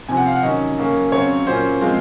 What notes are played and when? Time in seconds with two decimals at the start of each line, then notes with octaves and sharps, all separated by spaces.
0.09 C3 F3 C4 G#5
0.17 F#5
0.26 F5
0.34 F#5
0.43 D#3 F#3 C#4 D#5
0.77 C#3 F#3 A#3 C#4
1.12 C#3 F#3 C4 C#5
1.47 A#2 F#3 A#3 C#4 C5
1.81 F3 G#3 C4 F5